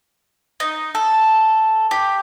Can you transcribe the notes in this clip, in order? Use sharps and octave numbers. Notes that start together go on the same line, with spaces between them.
D#4
A4
G4